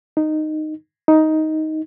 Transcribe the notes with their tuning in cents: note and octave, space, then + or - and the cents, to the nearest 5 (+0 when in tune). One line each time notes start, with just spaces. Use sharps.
D#4 -10
D#4 +10